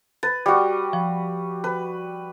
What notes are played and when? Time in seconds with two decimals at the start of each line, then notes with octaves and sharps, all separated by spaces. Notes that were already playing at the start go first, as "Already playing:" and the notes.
0.23 B4 A6
0.46 G3 F#4
0.93 F3
1.64 B4